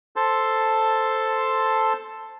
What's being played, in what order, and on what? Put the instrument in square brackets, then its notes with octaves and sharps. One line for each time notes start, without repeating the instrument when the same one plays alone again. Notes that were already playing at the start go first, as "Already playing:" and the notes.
[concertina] A4 C5 A5 C6